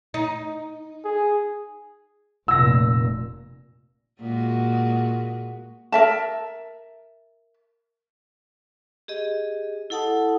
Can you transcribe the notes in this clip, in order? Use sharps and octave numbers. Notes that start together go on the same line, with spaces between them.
D#4
G#4
F1 A#2 E6 A#6
A#2 G#3 F#4
A#4 E5 A5
G4 G#4 D#5
E4 A4 F#5 A5 D#6